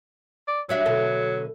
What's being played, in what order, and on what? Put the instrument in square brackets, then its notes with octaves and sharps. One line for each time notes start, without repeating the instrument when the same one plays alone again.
[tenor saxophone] D5
[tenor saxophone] F#3 [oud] G3 D4 E5
[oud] B2 D3 A4